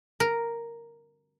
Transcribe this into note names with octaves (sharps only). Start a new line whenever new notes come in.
A#4